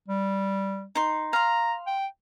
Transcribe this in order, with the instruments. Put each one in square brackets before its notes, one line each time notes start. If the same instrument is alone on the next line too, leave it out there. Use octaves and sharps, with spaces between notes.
[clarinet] G3
[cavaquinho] D#4 C6
[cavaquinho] F5 C6 [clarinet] A#5
[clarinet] G5